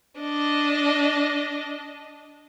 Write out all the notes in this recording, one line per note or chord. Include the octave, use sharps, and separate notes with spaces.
D4 D#5